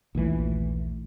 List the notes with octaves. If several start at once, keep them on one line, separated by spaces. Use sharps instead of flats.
A#1 D#2 E3 A3